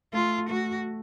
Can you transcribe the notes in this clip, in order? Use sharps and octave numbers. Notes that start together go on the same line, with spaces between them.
A3 F4
A3 F#4